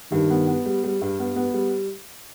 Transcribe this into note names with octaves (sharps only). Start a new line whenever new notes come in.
G2 D#3
B3
B3
G3
G3
G2
B3
B3
G3